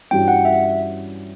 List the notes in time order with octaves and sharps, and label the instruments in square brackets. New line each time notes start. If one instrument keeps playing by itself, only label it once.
[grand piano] G2 E3 G3 C#4 F#4 [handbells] G5
[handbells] F#5
E5